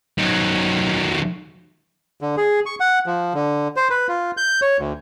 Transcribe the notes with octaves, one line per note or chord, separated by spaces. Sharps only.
D#3 F#3
D3
G#4
C#6
F#5
F3
D3
C5
B4
F4
G6
C#5
D2